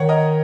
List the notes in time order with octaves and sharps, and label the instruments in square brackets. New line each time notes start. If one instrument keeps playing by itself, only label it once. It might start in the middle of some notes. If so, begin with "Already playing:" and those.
Already playing: [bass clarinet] D#3 [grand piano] C#5 F#5
[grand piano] A#4 D#5